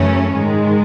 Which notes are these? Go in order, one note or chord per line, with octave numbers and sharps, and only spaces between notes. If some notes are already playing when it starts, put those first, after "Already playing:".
Already playing: F#2 C#3 E3 A3 C#4
G#2 D#3 G#3